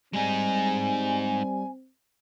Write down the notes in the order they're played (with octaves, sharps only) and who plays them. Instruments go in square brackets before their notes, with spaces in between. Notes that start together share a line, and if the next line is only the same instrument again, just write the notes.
[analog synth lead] G3 [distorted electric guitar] G#3 D#4 [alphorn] C4 [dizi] G#5